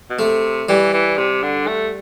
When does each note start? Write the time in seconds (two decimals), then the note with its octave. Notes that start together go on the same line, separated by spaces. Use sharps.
0.10 B2
0.19 C3 A3
0.69 E3 G3
0.94 E3
1.18 C3
1.43 D3
1.67 A3